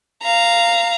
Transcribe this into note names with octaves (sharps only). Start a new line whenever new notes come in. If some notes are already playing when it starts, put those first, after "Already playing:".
F5 A#5